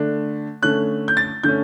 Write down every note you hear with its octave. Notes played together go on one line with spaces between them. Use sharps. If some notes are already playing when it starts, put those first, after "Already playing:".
Already playing: D3 A3 D4
D3 A3 C#4 F#6
G6
A6
D3 A3 C#4 G6